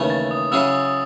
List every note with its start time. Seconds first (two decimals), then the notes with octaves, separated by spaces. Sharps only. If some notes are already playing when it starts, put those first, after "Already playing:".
Already playing: D#2 C#3 E3 A3
0.10 A6
0.31 D#6
0.52 C#3 F#3 C#4 E4 G#4 E6
0.68 D#6
0.83 D#6